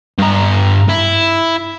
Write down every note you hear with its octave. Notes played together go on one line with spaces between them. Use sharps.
G2 A#5
E4